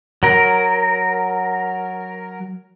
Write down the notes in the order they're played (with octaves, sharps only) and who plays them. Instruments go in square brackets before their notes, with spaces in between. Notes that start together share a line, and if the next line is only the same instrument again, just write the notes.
[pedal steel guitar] F#3 A#4